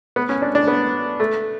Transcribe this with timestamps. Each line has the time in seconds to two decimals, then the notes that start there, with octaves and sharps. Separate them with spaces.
0.16 B3
0.29 C#4
0.42 D4
0.55 D4
0.68 B3
1.20 A3